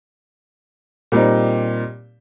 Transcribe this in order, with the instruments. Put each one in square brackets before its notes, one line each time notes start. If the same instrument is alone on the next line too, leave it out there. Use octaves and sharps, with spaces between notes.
[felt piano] A#2 G3 C4 D#4